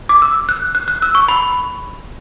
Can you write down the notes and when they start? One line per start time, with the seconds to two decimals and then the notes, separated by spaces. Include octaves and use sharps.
0.09 D6
0.22 E6
0.49 F#6
0.75 F#6
0.88 F#6
1.02 E6
1.15 C#6
1.29 B5